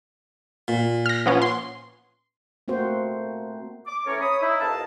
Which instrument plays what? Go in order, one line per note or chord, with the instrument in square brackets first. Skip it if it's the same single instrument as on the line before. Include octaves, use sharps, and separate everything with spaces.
[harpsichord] A#2
[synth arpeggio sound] F6 A#6
F3 B3 C#4
C6
[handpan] A3 A#3 C4 F#4 C5
[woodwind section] D6
E3 A3 C#4 A4 A#4 C#5
C#5 B5 D#6
D#4 E4
C2 F2 B4 D#5 F5 A5